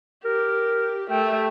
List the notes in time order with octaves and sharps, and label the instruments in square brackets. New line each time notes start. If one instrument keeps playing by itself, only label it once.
[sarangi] G4 [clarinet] A#4
[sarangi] A3 [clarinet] G5